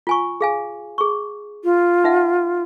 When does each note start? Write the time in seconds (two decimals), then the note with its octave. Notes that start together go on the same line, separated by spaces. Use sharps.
0.07 F4 G#5 C#6
0.41 G#4 F5 G#5
0.98 G#4 C#6
1.64 F4
2.04 D#4 E5 F#5